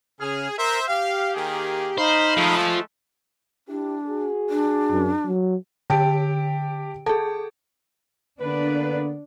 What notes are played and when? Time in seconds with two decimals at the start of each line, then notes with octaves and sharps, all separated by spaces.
0.20 C#3 G#4 F6
0.58 A#4 C5 E5 A#5
0.88 G4 F5
1.35 D#3 A#3 G#4
1.98 D#4 C5 F5 B5
2.37 F3 G#3 A3
3.68 D4 E4 G4
4.06 F#4 G#4
4.50 D4
4.92 F#2
5.27 F#3
5.90 D3 G4 G5 A5 D7
7.06 G#4 A4 A5
8.41 D3 A#3 B3 D4 B4